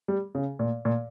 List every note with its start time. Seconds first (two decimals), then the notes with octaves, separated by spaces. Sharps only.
0.08 G3
0.35 C#3
0.59 A#2
0.85 A#2